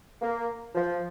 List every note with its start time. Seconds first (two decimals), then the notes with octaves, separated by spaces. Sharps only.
0.22 A#3
0.75 F3